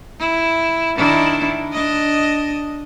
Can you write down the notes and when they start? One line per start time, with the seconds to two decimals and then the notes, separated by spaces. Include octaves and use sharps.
0.19 E4
0.96 D#3 D4 E4
1.73 D4 D#5